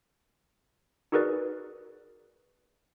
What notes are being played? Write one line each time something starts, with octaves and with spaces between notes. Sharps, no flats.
D#4 F#4 G#4 A#4 B4 D5